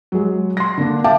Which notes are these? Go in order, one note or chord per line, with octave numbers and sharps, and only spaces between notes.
F#3 G#3
C6 A#6
D3 A#3 D4
E5 F5 G5 A5 D6